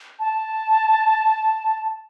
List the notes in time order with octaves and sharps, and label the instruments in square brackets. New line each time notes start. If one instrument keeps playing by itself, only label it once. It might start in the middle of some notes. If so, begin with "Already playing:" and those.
[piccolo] A5